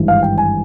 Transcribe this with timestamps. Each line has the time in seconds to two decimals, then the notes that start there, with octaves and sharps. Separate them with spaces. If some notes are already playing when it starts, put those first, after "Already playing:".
Already playing: G#1 G2 E3
0.08 F5
0.22 G5
0.38 G#5